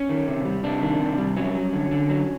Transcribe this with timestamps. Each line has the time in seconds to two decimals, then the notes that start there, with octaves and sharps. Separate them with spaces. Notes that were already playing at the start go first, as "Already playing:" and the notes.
Already playing: C#4
0.09 D#3
0.28 C3
0.45 G3
0.64 C3 D4
0.82 D#3
1.00 C3
1.18 G3
1.37 F#3 C#4
1.55 F#3
1.73 D3
1.91 D3
2.09 F#3